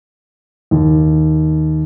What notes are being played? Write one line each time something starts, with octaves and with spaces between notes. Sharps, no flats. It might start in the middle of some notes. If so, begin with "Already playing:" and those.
D#2